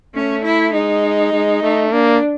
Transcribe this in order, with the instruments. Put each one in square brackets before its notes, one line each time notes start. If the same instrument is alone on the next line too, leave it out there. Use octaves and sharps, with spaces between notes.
[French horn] A3 [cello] C#4
[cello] E4
[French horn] G#3 [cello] D#4
[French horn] G#3
A3
[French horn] A#3 [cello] D4